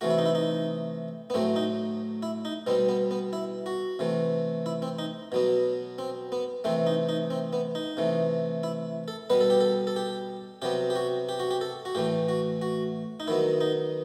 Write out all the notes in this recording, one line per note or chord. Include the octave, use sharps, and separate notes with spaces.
C3 E3 A3 F#4
E4
D#4
E4
D#4
B3
A2 F#3 A3 C4
D#4
E4
D#4
B2 G3 B3 C4
B3
B3
E4
F#4
C3 E3 A3
E4
C4
D#4
B2 F#3 B3
C4
B3
C3 E3 A3 C4
D#4
D#4
C4
B3
D#4
C3 E3 A3
E4
A4
B2 G3 B3 B4
A4
G4
A4
A4
G4
C3 F#3 B3 G4
G4
F#4
G4
F#4
G4
A4
F#4
A2 E3 A3 G4
F#4
F#4
D#4
D#3 F#3 B3 E4
D#4